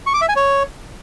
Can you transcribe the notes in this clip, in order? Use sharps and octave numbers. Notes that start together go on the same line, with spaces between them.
C#6
D6
E5
G#5
C#5